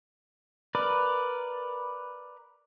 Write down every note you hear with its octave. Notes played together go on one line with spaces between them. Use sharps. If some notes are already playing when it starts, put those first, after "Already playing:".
A#4 B4 D5